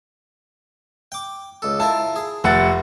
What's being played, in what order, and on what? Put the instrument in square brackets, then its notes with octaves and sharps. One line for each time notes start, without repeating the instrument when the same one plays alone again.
[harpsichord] G5 D6
C#2 A4
[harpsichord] E4 F4 A#4 [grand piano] A5
[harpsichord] G#4
[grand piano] F1 F#5 A6 [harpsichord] A3